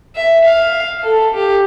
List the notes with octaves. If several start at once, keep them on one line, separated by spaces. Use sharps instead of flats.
E5
F5
A4
G4